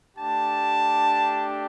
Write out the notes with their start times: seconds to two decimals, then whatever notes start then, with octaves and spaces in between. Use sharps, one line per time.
0.16 A3 D4 G4 A5